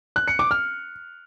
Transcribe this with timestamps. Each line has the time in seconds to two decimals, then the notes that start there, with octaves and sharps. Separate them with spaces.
0.16 F#6
0.28 C#7
0.39 D6
0.51 F6